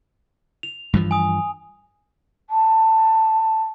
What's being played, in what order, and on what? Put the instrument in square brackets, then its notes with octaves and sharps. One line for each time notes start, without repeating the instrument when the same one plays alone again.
[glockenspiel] F7
[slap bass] G2 E3 F3
[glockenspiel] G#5 D#6
[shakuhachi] A5